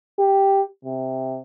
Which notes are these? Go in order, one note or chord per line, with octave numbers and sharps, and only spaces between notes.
G4
C3